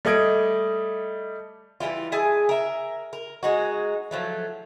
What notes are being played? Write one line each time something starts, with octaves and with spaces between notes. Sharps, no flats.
G3 A3 D#5 G#6 D7
E3 G3 E4 F4
E4 G#4 G#5 A5
A#4 E5
A#4
G#3 D#4 F#4
F3 F#3 A3